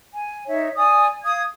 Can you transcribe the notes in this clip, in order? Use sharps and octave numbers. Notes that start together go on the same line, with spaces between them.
G#5
D#4 C#5 E5
D5 G#5 D#6
F5 D#6 G#6